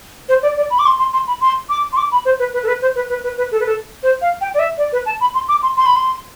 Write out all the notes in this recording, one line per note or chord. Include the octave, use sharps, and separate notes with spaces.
C5
D5
D5
B5
D6
C6
C6
C6
B5
C6
D6
C6
D6
B5
C5
B4
B4
A4
B4
C5
B4
B4
B4
B4
A4
B4
A4
C5
F5
G5
D5
E5
D5
B4
A5
B5
C6
D6
C6
C6
B5
C6